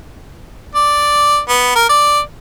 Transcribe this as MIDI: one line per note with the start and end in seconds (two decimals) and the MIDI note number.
0.75 1.39 74
1.49 1.72 59
1.76 1.86 70
1.89 2.19 74